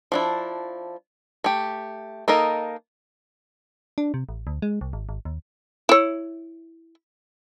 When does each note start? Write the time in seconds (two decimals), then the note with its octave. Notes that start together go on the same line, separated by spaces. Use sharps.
0.12 F3 D4 E4
1.44 A3 G4
2.28 A#3 D#4 A4 A#4 D#5
3.98 D4
4.14 C3
4.29 A1
4.47 D2
4.62 G#3
4.81 C2
4.93 G#1
5.09 G#1
5.25 D#2
5.89 E4 C#5